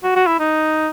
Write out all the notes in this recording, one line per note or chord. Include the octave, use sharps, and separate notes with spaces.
F#4
F#4
E4
D#4